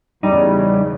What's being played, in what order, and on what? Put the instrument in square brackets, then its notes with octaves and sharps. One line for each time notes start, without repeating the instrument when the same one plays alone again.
[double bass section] E2 C#3 [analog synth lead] G3 [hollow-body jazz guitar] D#4